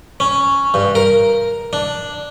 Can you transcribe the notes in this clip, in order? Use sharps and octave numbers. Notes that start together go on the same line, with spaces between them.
C#4
G2
A#4
D4